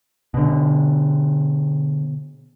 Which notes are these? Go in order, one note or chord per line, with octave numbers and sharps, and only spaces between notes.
B2 D3